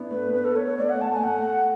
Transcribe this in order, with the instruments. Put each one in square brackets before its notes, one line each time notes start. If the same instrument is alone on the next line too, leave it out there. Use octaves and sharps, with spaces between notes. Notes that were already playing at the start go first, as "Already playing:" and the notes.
Already playing: [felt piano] B3 D4 E4
[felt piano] A3 [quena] B4
[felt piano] B3 [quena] B4
[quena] A4
C#5
C#5
[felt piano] A3 [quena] D5
[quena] F#5
[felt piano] A3 [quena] A5
[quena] G#5
[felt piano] A3 [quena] F#5